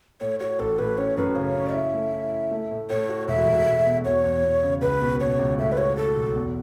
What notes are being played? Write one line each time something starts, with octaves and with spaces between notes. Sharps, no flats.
A2 C#5
F#4 C#5
A1 A4
A2 B4
C#4 C#5
F#2 B4
C#3 C#5
C#4
E4 E5
A3
E4
E4
A3
A2
A2 C#5
F#4
E1 E5
E1
E1
B2
E2 C#5
E2
E2
C#3
C#2 B4
B2
B2 C#5
C#2
A2 E5
B4
F#4 C#5
F#4 A4
B1
E2